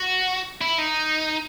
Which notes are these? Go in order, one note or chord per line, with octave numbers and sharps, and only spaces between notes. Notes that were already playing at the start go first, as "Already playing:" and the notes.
Already playing: F#4
E4
D#4